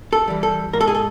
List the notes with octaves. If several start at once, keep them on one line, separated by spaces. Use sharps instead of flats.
A4
E3 G3
A4
G#2 A#4
A4
G#4
A4